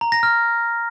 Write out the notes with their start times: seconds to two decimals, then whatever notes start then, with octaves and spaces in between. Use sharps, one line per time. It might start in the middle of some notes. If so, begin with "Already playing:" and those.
0.01 A#5
0.12 A#6
0.23 F6